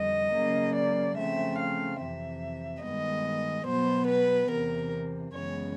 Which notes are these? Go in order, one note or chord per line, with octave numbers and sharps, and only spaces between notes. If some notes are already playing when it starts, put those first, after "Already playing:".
Already playing: F2 D3 G3 D#5
C#3 F#3 A#3
D5
C#3 F3 A3 C4 E5
F5
F2 C3 E3 E5
G2 D#3 G#3 B3 D#5
B2 F#3 B3 C5
B4
E2 C3 E3 A#4
F#2 C#3 E3 G#3 B3 C#5